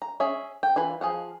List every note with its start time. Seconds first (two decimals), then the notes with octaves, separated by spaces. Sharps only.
0.02 A#5
0.20 C#4 G#4 C#5 E5
0.63 G5
0.76 E3 F4 B4 G#5
1.01 F3 G#4 F5 F#5